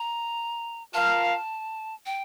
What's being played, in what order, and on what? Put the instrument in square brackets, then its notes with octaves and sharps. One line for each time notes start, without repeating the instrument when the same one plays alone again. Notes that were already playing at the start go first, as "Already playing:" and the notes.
Already playing: [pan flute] A#5
[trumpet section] F4 A#4 F5 [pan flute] A5
[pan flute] G5